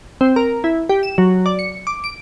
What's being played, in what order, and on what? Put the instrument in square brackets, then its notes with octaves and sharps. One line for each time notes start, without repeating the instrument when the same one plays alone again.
[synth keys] C4
A#4
E4
G4
E7
F#3
D5
C#7
D6
D7